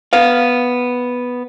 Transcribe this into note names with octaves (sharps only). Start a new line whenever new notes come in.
B3 F5